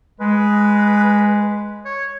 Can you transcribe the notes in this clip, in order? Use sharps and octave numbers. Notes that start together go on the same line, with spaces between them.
G#3 B4
C#5